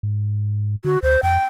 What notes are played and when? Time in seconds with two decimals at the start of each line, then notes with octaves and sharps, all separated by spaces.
0.03 G#2
0.84 D3 F#4
1.03 D2 C5
1.23 F2 G5